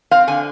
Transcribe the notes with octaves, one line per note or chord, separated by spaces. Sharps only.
C4 F5
D3 G#5